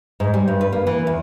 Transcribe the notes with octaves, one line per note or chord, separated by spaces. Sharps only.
G#2
G3
G2
B4
A#3
E3
E2